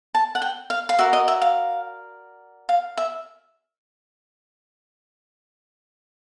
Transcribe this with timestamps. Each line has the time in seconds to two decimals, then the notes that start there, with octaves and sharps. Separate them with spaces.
0.15 A5
0.35 F#5
0.42 G5
0.70 F5
0.89 F5
0.99 F#4 A#4 D5 E5
1.13 D#5
1.28 E5
1.42 F5
2.69 F5
2.97 E5